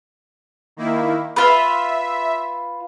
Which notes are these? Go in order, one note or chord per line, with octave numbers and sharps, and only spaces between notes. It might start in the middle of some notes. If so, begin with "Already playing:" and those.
D#3 A#3 E4
F4 B4 E5